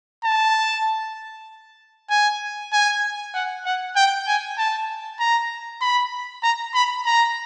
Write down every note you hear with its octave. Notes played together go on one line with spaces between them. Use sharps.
A5
G#5
G#5
F#5
F#5
G5
G#5
A5
A#5
B5
A#5
B5
A#5